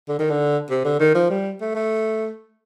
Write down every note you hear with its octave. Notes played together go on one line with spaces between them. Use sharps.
D3
D#3
D3
C3
D3
D#3
F3
G3
A3
A3